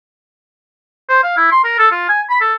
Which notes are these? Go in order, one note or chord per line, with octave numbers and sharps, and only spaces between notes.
C5
F5
E4
C6
A#4
A4
F4
G#5
B5
A4